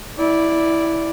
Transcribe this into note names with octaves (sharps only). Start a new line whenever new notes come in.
E4 D5